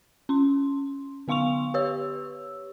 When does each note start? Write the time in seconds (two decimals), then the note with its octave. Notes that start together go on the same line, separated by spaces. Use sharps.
0.29 C#4 C6
1.28 D3 B3 F5 C6 C#6 F7
1.74 G4 B4 C#5 E6